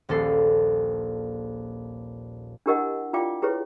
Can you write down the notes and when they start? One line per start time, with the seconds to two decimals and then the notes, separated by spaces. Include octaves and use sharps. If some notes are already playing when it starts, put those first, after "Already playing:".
0.09 D#1 A#1 A4 C7
2.66 D4 E4 G4 A#4 D#5 F#5
3.13 E4 F4 D5 F5 G5 D6
3.42 E4 G4 G#4 B4 C#5